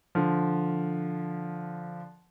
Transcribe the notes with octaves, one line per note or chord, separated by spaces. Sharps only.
D3 F3